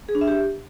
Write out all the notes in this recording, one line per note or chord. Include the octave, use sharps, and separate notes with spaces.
G#4
D4
E5
G4